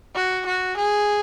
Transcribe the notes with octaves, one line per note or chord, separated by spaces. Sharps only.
F#4
F#4
G#4